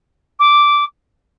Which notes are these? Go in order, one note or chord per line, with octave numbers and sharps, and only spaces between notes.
D6